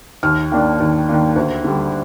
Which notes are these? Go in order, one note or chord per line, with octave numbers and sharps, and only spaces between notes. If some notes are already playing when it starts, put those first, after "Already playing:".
D#2 F6
D#3 A#3 D4
D#2
D#3 A#3 D4
D2
D3 G3